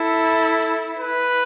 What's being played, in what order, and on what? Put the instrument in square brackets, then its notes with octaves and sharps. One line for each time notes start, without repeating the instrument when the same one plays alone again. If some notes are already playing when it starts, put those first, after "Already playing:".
Already playing: [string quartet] E4 [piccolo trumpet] A4
[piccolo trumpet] B4